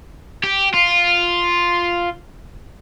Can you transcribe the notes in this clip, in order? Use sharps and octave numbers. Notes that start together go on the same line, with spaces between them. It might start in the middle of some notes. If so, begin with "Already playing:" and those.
G4
F4